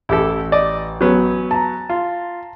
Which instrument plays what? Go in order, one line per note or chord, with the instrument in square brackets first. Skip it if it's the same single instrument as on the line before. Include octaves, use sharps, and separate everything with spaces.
[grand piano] A1 [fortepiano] E4 G4 A4
[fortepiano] D5 D#5
F#3 B3 C#4
[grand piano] A5 A#5
[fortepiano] F4